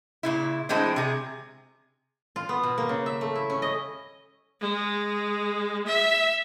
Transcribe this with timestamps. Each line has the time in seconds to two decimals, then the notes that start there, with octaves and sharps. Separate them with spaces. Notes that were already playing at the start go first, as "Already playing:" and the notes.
0.23 A#2 C#3 E4
0.69 E3 G#3 A3 C4 D4
0.96 C3 G#4
2.36 F4
2.49 B3
2.63 B2
2.78 A#3
2.89 C#3
3.06 E5
3.21 A3
3.35 E4
3.50 C#4
3.62 D#5
4.60 G#3
5.87 E5